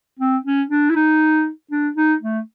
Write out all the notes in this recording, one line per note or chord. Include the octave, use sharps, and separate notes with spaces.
C4
C#4
D4
E4
D#4
D4
D#4
A3